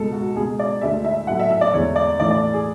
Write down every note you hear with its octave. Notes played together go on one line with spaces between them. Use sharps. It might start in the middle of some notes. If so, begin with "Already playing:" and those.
Already playing: C#2 B2 G#3 A4
F#4
C#2 B2 G#3 G#4
D5
D2 D3 G#3 E5
E5
A2 F#3 A3 F#5
E5
E5
D5
E2 D3 G#3 C#5
D5
A2 E3 A3 D5
D5
G#4